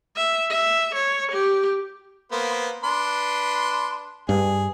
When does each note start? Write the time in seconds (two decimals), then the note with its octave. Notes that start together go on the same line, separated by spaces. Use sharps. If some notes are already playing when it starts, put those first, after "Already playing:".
0.16 E5
0.51 E5
0.95 C#5
1.31 G4
2.32 A#3 B3 C5
2.84 D4 B4 C6
4.29 G2 G#4